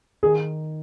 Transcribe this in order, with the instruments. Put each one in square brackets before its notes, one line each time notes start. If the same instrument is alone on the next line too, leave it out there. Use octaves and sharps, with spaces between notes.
[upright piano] D#3 [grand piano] G#4